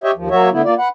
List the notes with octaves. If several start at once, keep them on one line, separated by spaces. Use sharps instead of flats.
G4 C#5 D#5 E5 G5
D#2 F3
F#3 A#3 F#4 C#5 E5
D3 A3 B3 E4
A#3 F4 D5
B4 F#5